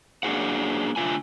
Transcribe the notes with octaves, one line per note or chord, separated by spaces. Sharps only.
A#3 D4 D#4 F#4 G#4 F#5
D3 A3 F4 G#5